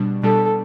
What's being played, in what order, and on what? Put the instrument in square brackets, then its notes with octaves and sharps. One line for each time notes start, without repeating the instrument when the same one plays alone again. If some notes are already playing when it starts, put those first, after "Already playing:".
Already playing: [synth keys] B2 G3 D4
[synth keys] B2 G3 D4 [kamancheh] A4